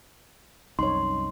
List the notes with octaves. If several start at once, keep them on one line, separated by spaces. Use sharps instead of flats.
C2 F#2 D#4 C#5 C6